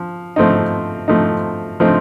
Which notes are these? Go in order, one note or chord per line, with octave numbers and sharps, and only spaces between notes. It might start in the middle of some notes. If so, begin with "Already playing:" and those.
Already playing: F3
F3 A3 C4 D#4
F3 A3 C4 D#4
F3 A3 C4 D#4